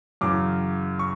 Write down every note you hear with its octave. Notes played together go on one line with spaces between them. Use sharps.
F#2 C#3 E3 D6
C#6